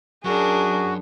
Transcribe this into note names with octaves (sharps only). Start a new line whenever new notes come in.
F#2 D4 F#4 G#4 A#4